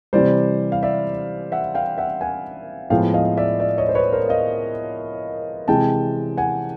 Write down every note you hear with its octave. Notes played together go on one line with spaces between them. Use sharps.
C3 E3 G3 C5 D5
F5
D5 E5
E5 F#5
F5 G5
E5 F#5
F#5 G#5
A2 F3 G#3 B3 F5 G5
D#5 F5
D5 E5
D5 E5
C#5 D#5
C5
B4 C#5
A#4 C5
D#5 F5
C3 E3 G#3 G5 A5
F#5 G#5